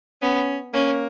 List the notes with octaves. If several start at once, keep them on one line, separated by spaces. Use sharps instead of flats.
B3 C#4
A#3 C#4